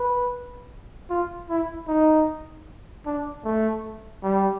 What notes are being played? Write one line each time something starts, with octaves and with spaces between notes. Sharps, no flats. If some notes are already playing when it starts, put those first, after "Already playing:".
Already playing: B4
F4
E4
D#4
D4
A3
G3